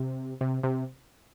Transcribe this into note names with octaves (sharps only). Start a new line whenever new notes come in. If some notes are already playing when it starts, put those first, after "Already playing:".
Already playing: C3
C3
C3